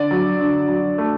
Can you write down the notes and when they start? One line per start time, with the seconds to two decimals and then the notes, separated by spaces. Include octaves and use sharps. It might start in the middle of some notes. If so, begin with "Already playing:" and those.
Already playing: D3 D5
0.11 F#3
0.40 D3
0.69 F#3
0.98 A3